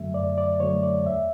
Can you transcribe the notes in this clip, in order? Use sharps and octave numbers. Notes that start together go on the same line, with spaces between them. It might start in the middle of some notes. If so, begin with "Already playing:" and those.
Already playing: F#2 D3 F#3 A3 E5
F#2 D5
D5
D3 F#3 A3 C#5
D5
E2 E5